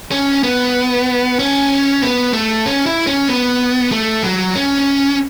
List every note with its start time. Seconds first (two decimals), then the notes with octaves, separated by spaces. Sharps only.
0.11 C#4
0.43 B3
1.39 C#4
2.02 B3
2.33 A3
2.66 C#4
2.86 E4
3.07 C#4
3.29 B3
3.92 A3
4.23 F#3
4.55 C#4